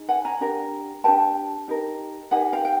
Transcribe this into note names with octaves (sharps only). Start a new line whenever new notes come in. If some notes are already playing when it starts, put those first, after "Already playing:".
Already playing: D#4 G#4
F#5 G#5
G#5 A#5
D4 G4 A#4
D4 G4 A#4 G5 A5
D#4 G4 A#4
D#4 G4 A#4 F#5 G#5
F5 G5
G5